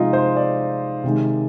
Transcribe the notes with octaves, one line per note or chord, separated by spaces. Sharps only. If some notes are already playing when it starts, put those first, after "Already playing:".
Already playing: C3 F3 G#3 D#4 F4
C5
D5
C3 D#3 G#3